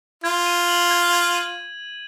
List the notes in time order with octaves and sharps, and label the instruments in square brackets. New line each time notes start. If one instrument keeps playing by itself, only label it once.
[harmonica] F4 [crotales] G#6
[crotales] D#7
F#7
G#6
G#6
D#7